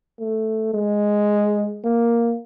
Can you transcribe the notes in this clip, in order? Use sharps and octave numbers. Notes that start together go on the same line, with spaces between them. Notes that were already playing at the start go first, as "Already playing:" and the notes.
A3
G#3
A#3